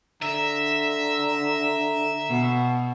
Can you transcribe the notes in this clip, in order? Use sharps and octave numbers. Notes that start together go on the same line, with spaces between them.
D3 E5 A#5
B2